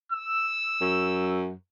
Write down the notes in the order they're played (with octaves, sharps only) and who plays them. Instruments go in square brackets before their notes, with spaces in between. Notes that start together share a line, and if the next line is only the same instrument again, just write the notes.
[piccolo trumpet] E6
[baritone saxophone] F#2